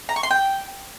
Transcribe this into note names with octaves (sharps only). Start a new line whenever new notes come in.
A#5
C#6
C6
G5